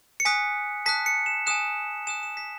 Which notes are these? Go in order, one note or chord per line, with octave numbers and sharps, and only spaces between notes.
C#7
G#5 D#6 F#6 B6
A5 D#6 F#6 B6
C#7
E7
G#5 D#6 F#6 E7
G#5 D#6 F#6 E7
E7
B6